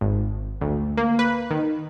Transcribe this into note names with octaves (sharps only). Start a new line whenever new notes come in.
G#1
D2
A#3
B4
D#3